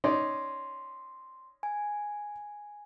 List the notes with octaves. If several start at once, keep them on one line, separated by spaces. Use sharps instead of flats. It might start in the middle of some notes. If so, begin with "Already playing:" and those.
C#4 D#4 D5 C6
G#5